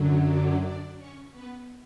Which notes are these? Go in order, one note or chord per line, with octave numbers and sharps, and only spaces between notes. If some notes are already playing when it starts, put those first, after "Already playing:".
Already playing: F#2 D3 F#3
D4 D5
D4 D5
C#4 C#5
B3 B4